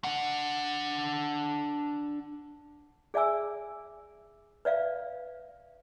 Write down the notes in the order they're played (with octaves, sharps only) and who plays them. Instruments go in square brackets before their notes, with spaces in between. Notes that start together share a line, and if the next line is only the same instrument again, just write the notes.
[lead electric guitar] D4 F#5
[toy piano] G#4 D5 E5 G#5 E6
B4 D5 E5 F5